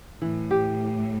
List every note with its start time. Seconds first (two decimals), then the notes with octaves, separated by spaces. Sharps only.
0.22 A2 E3
0.51 G4